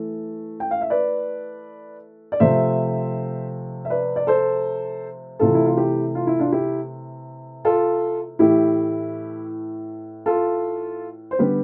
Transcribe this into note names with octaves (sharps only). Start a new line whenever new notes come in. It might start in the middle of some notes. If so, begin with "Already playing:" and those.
Already playing: E3 A3
G5
F5
E5
B4 D5
D5
C3 F3 A3 C4 C5 E5
E5
B4 D5
D5
A4 C5
C3 E3 A3 F4 A4
E4
F4
E4 G4
F4
E4
D4 F4
E4 G4
F4 A4
A2 E3 A3 E4 G4
F4 A4
C5
D3 G3 B3 G4 B4